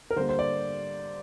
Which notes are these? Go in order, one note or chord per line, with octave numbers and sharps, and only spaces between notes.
A#4
D3 G3 A#3 C5
C5
D5